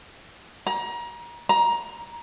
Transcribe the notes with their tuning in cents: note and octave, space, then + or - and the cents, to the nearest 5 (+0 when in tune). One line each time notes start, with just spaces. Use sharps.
A#5 +30
A#5 +15